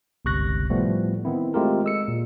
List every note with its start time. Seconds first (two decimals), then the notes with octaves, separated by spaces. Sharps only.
0.25 G1 C#2 C3 C#6 F#6 A#6
0.70 A2 F3 G3 A3 B3
1.25 D#3 B3 C4 E4
1.54 G#3 A3 C4 F4 G4 A#4
1.84 G#3 E6 C#7
2.08 A#2